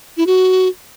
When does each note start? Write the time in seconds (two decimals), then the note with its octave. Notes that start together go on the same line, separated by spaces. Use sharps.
0.17 E4
0.27 F#4